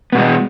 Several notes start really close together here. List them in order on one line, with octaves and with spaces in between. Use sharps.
B3 B2 G#3